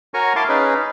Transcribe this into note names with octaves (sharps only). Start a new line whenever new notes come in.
F#4 A#4 C#5 G#5 A#5 C#6
E4 F5 A5 C6 D6
C#4 D#4 G#4 B4